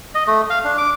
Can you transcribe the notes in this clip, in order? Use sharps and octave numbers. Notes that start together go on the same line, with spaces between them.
D#5
A3
F5
D4
D6